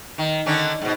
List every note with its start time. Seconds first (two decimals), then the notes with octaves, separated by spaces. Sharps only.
0.18 D#3
0.46 D3 D#3 C#4
0.82 G#2 B2